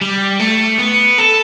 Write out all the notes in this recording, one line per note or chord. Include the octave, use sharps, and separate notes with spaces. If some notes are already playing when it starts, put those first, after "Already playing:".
G3
A3
B3
A4